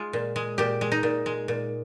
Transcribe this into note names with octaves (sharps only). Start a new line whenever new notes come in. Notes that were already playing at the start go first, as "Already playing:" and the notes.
Already playing: G#3 F4
A#2
G#3
A#2 G4
G#3
D#4
A#2
G#3
A#2